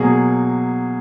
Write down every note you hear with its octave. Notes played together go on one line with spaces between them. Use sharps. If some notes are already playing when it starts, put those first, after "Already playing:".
Already playing: B2 F#3 A#3 G#4